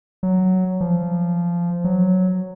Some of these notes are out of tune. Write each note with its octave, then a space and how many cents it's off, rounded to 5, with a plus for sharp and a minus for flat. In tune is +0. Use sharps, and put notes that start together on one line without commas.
F#3 +5
F3 -15
F#3 +0